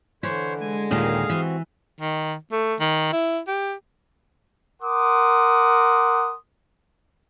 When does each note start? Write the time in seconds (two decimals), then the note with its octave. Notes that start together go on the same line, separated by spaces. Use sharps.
0.23 D3 E3 C5 C#5
0.61 G#3 G#5
0.91 D#2 A#2 D#3 G#4 F5
1.30 E3 C4 F#4
2.00 D#3
2.52 A3
2.80 D#3
3.13 E4
3.47 G4
4.82 A#4 F#5 C6 D6 D#6